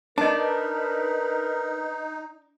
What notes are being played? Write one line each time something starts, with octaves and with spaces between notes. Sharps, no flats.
D4 D#4 A#4 B4 D#5 A5